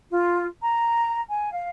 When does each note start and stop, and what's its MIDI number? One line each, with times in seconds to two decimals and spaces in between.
0.10 0.46 65
0.61 1.20 82
1.30 1.52 80
1.53 1.69 77